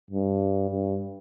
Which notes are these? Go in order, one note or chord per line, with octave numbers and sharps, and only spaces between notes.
G2
G2